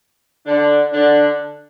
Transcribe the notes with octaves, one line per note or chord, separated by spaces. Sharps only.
D3 D4
D3 D4